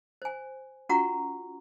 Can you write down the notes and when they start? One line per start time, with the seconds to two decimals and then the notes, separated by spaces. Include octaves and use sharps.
0.22 C5 G#5
0.89 C#4 F4 F#4 F#5 A#5 C#6